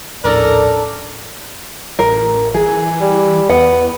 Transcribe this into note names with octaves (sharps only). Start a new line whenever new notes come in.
A#1 D#2 A2 C#4 D4 A4 A#4 D5
A1 A#4
E3 G#4
G3
E2 B3 F#5